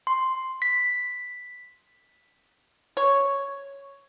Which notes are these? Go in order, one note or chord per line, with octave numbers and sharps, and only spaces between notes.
C6
B6
C#5